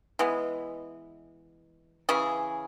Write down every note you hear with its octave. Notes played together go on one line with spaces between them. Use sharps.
E3 G#3 B3
C#3 E3 C#4 G#4